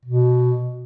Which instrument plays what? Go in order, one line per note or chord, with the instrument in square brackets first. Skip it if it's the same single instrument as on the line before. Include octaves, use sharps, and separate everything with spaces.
[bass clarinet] B2